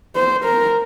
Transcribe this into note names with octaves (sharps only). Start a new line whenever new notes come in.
C5
A#4